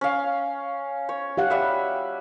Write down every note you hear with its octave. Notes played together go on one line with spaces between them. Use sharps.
C#4 F5
C#5
G4 F5 F#5
G3 E5 E6